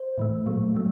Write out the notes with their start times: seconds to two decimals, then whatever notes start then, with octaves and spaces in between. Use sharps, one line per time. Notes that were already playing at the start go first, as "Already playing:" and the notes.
Already playing: C5
0.18 A2 E3 A3
0.46 A#2 F#3 A3
0.75 A#2 F#3 A3